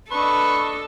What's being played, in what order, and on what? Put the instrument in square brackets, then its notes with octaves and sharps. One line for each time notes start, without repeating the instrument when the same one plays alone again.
[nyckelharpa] D4 D#5 [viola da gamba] A4 [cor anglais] B4 [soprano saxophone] C#6